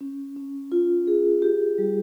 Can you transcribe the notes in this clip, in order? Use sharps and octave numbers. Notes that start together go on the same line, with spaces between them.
C#4
C#4
F4
G#4
G4
G3